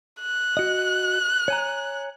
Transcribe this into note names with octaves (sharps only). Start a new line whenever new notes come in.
F#6
F#4 D#5
C#5 G#5 A#5